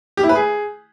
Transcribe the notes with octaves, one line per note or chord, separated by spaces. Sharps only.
G4
E4
B4
G#4